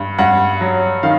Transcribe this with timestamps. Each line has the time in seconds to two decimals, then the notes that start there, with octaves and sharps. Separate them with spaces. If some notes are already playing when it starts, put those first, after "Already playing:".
Already playing: G2
0.19 G2 F#5
0.61 F#3
1.03 D#3 F5